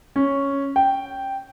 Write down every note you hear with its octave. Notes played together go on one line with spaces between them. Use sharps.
C#4
G5